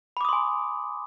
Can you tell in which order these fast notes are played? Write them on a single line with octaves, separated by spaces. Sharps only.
B5 D6 D#6 C6 G#5